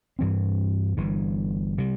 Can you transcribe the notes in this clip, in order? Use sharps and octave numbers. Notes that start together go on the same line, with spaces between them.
G2 E3 C4
G1 G2 E3
C3 E3 G3